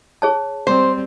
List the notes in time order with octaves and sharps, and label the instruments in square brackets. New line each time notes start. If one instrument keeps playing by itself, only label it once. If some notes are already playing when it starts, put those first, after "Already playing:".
[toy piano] G#4 C#5 A5
[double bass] G3 C4 [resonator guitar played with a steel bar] C5